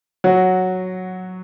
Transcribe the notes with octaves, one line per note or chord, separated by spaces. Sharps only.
F#3 F#4